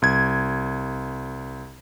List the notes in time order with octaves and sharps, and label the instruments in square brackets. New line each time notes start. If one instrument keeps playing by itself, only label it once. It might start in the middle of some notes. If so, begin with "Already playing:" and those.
[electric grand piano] C2 G#6